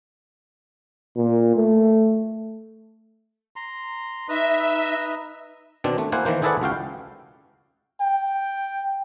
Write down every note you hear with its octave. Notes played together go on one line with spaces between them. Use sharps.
A#2
A3
A#5 C6
D#4 B4 D#5 E5 A#5
B2 D#3 C4 D4
A3
A#3 E4 C5 F#5 G#5
D#3 E3 A#3 C5
E4 G#4 A4 B4 D5 F#5
C#2 F#4 F5 G5
G5